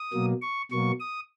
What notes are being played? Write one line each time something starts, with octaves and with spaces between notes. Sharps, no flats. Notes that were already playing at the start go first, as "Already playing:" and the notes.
Already playing: D#6
B2 F#3 A#3
C#6
B2 F#3 A#3 C#6
D#6